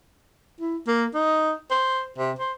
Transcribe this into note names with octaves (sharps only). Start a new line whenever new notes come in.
E4
A#3
D#4
C5
C3
C5